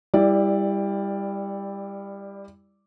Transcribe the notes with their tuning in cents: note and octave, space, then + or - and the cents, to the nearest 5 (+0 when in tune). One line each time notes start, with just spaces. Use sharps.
G3 +20 E4 +0 D5 +0